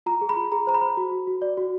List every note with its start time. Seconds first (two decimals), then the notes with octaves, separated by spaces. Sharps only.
0.06 F4 A#5
0.21 G#4
0.29 B5
0.36 F4
0.52 G#4 A#5
0.67 C5 A#5
0.74 B5
0.81 C5
0.97 F#4
1.12 F#4
1.27 F#4
1.42 D5
1.57 F#4